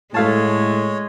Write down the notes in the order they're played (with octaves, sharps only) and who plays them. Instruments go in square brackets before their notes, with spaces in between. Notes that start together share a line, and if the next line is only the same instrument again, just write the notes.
[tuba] A2 [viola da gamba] G#3 [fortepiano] A3 F5 A5 [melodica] C#5